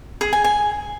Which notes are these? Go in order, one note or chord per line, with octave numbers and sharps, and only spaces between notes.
G#4
G#5
G#5